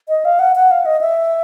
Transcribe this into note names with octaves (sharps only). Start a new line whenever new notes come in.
D#5
F5
F#5
F#5
F5
D#5
E5